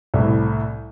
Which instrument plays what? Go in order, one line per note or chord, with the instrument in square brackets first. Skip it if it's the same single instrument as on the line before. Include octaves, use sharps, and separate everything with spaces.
[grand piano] C2 A2 A3